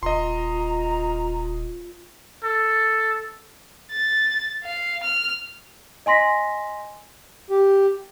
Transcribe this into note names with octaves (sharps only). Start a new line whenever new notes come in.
D#1 F4 D#5 A#5 C6
A4
A6
F5
F6
D#5 G#5 C6 A#6 B6
G4